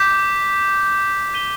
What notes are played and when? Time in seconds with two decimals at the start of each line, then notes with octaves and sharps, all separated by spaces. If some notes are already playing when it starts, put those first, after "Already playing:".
Already playing: D6 G6 B6
1.34 G6 B6 D#7 G7